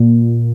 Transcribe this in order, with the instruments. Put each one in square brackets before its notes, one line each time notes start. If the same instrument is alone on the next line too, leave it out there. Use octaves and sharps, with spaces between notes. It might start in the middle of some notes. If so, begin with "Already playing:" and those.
Already playing: [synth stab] A#2